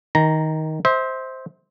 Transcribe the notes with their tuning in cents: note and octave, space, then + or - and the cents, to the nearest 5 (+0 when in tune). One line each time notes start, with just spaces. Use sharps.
D#3 +15 A#5 +0
C5 +0 E5 -35